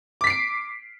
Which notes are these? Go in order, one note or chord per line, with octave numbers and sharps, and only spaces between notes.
D6 B6 C7 D7